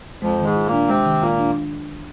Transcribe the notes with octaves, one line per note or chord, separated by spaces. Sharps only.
F2 F3 G#3
D#3
G#2 G#3
F4
A#2 A#3
D4
C3 G#3 C4
D#3
A#2 A#3 F4
D4